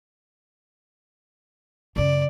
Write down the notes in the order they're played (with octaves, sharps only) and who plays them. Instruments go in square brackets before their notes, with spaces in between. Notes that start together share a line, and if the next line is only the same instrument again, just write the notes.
[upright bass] F#2 C#3 [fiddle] D5